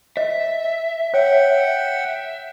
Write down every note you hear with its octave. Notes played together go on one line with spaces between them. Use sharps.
D#5 E5
C#5 F#5 G5